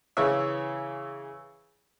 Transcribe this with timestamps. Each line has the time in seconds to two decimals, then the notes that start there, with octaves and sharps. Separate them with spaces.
0.17 C#3 E3 C#5 E5